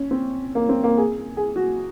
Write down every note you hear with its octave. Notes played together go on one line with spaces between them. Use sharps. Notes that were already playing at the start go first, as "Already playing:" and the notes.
Already playing: C#4
C4
A#3
C4
A#3
G#4
G#4
F#4